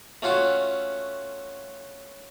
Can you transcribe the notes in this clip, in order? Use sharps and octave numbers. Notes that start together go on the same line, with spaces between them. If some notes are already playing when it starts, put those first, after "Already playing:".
A3 C#4 F4 F#4